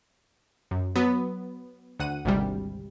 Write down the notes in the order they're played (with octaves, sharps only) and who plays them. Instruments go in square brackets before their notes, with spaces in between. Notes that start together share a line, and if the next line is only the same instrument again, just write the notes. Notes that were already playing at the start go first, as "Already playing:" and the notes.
[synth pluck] F#2
F#3 B3
D2 F#5 D#7
G#1 D2 C3 G3